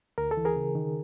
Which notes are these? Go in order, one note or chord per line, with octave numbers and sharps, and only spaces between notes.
D2 A#4
A4
E3
G#4 A#4
C#3
D#3